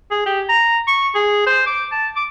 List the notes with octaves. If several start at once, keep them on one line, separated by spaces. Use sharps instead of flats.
G#4
G4
A#5
C#6
G#4
C5
D6
A5
D6